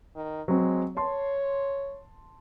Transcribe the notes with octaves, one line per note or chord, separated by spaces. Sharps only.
D#3
F#3 G#3 C4
C#5 A5 C6